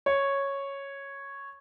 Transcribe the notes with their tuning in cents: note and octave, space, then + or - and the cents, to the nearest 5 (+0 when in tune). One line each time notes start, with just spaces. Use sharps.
C#5 -5